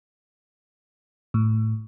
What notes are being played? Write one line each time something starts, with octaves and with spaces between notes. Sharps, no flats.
A2